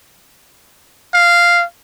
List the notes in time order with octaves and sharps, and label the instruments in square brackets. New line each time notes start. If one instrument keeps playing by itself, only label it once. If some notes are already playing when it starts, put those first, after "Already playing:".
[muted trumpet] F5